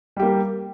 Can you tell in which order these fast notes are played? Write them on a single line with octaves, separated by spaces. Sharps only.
G3 G4 A#3